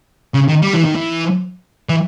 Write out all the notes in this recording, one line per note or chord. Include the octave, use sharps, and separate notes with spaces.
C#3
D#3
G3
E3
D#3
E3
E3